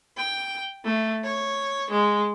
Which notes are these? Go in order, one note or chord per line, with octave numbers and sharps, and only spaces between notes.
G5
A3
C#5
G#3